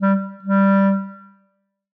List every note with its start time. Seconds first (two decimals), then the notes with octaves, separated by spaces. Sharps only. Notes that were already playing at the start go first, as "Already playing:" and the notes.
0.01 G3
0.43 G3